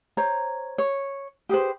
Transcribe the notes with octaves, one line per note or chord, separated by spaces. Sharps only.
C5 C#5 A#5
C#5
G4 G#4 B4 C5